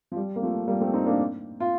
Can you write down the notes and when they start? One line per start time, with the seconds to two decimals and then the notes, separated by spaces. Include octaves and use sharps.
0.12 F3
0.16 G3
0.36 A#3
0.42 F3 A3
0.68 G3 A#3
0.81 A3 C4
0.94 C4 D#4
1.06 A#3 D4
1.60 F4